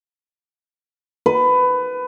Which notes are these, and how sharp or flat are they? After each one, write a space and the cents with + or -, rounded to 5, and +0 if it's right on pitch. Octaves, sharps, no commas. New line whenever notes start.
B4 +20